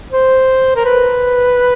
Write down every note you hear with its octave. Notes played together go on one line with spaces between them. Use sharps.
C5
A#4
B4